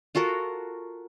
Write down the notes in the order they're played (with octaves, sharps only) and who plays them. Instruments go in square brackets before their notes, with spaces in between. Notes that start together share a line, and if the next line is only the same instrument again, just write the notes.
[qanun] F4 F#4 A4 A#4